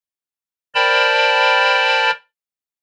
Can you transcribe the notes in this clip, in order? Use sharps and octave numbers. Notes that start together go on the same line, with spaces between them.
A#4 C5 D5 G5 A5 B5